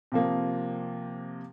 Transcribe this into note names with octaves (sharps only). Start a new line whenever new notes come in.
C3 F3 A#3